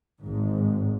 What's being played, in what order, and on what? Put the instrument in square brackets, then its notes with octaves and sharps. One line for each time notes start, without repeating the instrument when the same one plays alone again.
[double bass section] G#1 G#2